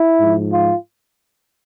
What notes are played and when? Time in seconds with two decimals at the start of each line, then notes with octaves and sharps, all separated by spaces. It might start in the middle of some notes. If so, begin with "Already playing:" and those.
Already playing: E4
0.18 G#2 F3
0.50 F4